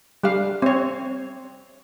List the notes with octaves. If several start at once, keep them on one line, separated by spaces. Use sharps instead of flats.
G3 G4 F5
C4 C#5